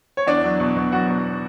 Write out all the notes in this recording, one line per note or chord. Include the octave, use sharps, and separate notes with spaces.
C#5
E2 D4 D5
F#3
B2
B2
F#3 F#4 F#5
B2